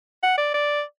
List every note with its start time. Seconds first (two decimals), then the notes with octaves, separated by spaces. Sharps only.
0.23 F#5
0.38 D5
0.54 D5